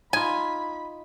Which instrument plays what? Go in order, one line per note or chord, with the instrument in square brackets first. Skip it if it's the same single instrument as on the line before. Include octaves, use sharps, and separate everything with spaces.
[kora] D#4 F4 [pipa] G#5 [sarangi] B5